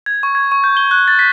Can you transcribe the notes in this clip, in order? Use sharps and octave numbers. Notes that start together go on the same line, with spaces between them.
G#6
C#6
G#6
C#6
G6
G7
F#6
A6
B6